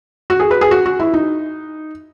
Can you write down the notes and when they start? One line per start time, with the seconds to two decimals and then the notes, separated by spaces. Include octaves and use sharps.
0.30 F#4
0.40 G#4
0.51 B4
0.61 G#4
0.71 F#4
0.86 F#4
1.00 E4
1.14 D#4